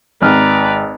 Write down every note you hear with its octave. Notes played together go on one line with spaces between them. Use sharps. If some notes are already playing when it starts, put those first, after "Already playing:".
G#1 B4 D5 A#5 F6